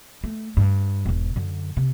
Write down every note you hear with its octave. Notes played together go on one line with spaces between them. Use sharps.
A3
G2
E1 G#2
F#2 D3
C3